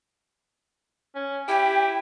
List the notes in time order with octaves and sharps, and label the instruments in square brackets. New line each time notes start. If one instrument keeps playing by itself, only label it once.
[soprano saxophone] C#4
[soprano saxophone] E4 [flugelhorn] G4 [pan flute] G5